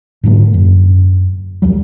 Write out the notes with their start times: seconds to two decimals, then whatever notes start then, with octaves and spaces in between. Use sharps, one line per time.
0.23 G#2 D3 F#3 A#3
0.54 F#2
1.62 D#2 F#3 G3